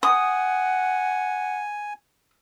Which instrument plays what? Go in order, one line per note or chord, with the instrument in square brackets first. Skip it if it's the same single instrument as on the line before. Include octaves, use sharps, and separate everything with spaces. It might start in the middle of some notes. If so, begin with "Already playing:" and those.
[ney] F#5 [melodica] G#5 [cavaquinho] D#6